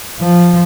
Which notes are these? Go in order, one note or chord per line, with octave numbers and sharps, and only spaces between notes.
F3